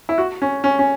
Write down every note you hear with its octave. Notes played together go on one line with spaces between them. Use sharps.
E4
F#4
C#4
C#4
C#4